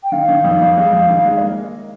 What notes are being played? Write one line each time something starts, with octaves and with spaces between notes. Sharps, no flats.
G5
D#3 F5
D#3
F2
F2
G#3
F2
D#3
G#3
C#5
A#3 D#5